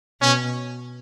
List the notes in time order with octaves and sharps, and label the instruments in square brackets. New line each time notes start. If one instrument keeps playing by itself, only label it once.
[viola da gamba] B2 [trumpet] C#4